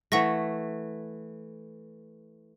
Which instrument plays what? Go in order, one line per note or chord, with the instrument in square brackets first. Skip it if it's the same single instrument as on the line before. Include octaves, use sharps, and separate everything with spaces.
[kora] E3 A3 [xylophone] F#5 C#6 A#6